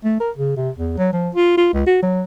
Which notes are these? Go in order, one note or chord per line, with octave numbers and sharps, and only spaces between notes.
A3
A#4
C#3
C3
E2
F#3
F3
F4
F4
C#2
F#4
F#3